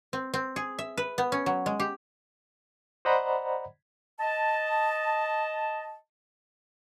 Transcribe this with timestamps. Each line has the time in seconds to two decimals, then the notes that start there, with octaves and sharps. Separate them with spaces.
0.13 C4
0.34 C4
0.56 G#4
0.79 E5
0.98 B4
1.18 B3
1.32 C#4
1.46 F#3
1.66 G#3
1.80 G4
3.05 C5 D5 D#5 F#5 A#5 B5
4.19 D#5 A5